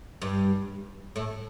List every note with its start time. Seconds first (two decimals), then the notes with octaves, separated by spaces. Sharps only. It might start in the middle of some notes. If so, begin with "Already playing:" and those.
0.22 G2 G3
1.16 A2 A3